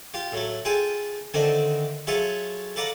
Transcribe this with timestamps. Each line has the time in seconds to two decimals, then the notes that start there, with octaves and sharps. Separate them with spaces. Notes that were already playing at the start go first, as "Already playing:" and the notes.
0.14 F4 G4
0.32 A2 F#3 A3
0.65 F4 G#4 A4 G5 G#5 C6
1.34 D3 D#3 A3 C4 D4 D#4
2.07 F#3 F4 G#4 A4 C#5 E5
2.76 A4 B4 D5 F5 F#5 A#5